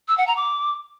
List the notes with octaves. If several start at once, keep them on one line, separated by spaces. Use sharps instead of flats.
E6
F#5
A#5
D6